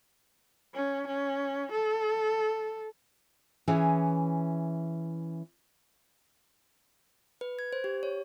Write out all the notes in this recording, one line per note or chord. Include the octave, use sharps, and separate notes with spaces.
C#4
C#4
A4
E3 C#4 G#4 G#5
B4
G#6
C5
G4
C#5